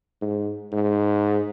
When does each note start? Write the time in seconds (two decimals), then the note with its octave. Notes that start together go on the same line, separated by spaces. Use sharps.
0.21 G#2
0.72 G#2